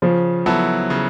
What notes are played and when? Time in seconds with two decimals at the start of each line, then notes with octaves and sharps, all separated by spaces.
0.02 C#3 F3
0.46 F#3 B3 E4 A4
0.90 C#3